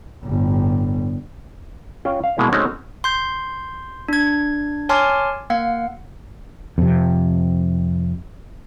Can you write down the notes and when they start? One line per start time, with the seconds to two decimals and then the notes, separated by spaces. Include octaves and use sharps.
0.24 G1 A2
2.05 C#4 F4 G5
2.24 F5
2.38 B2 G#3 A#3 E4
2.52 G#3 A3 C4 C#4 D#4 F#4
3.04 C6 G6
4.08 D4 G#6
4.89 C#5 G#5 A5 C6 D6 F6
5.50 A#3 F5 F#5
6.78 F2 C3